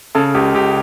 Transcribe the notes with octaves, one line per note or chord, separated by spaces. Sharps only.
C#3 A4
C#2 G4
C#2 G4